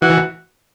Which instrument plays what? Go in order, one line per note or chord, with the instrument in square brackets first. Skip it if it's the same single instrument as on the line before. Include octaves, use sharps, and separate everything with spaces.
[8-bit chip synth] E3 [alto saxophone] F#4